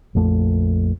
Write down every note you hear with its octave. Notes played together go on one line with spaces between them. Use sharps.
A#1 F2 A3